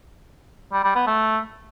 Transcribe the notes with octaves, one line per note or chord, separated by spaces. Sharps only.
G3
G3
B3
A3